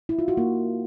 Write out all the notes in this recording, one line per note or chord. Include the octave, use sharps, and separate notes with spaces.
E4
F4
F#4
A#3